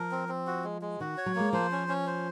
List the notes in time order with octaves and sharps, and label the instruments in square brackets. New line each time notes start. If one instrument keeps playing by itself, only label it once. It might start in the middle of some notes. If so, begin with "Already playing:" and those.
Already playing: [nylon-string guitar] F3 [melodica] A#4
[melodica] C4
C4
F#4
G#3
G#3
[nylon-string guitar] D#3 [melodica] F#4
[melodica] C#5
[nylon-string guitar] F#3
[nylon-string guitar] G#3 [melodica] A#3
[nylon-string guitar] F3 [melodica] C5
[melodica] C#4
C#4
C5